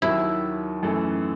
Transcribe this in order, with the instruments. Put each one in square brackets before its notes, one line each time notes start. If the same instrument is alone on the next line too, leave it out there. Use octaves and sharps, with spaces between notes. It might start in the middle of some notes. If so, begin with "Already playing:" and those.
[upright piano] D#2 D#3 F#3 [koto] E4
[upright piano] F#2 E3 A3 D#4 A4